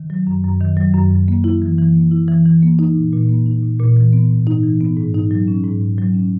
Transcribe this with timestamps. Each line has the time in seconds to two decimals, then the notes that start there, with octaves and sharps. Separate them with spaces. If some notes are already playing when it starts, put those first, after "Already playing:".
Already playing: D#3
0.10 F#3
0.27 F#2
0.44 F#2
0.61 D#3
0.77 F#3
0.94 F#2
1.11 F#2
1.28 A#3
1.44 E4
1.62 E3
1.78 E3
1.95 A#3
2.11 E4
2.28 E3
2.46 E3
2.62 A#3
2.79 D#4
2.96 A#2
3.13 A#2
3.29 A#3
3.46 D#4
3.62 A#2
3.80 A#2
3.97 E3
4.13 B3
4.30 G#2
4.47 D#4
4.63 E3
4.81 B3
4.97 G#2
5.14 D#4
5.31 F#3
5.48 C#4
5.64 G#2
5.81 G#2
5.98 F#3
6.15 C#4